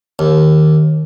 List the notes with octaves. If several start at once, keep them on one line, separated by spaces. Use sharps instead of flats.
D#2